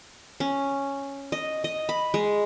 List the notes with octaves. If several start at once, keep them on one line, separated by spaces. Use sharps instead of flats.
C#4
D#5
D#5
B5
G#3